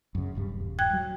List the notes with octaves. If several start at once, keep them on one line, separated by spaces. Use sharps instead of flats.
F#2 C#3
D#1 G2 G3
G5 F#6 G#6
F#3